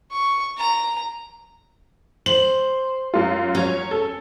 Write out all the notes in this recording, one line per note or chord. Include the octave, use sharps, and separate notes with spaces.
C#6
A#5
C5 F#7
F#2 F4
F#3 C#4 C#5
A4